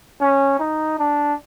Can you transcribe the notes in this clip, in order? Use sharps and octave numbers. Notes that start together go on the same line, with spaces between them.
C#4
D#4
D4